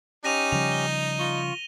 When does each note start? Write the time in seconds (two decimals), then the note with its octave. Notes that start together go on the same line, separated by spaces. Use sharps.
0.25 C#4 D#4 G4 A#6 D#7 F7
0.52 C#3 F3 G3 F7
0.72 G7
1.19 F4 C#6 G7